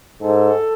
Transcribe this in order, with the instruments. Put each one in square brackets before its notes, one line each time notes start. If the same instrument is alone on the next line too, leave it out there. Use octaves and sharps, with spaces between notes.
[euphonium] G#2 [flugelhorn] A4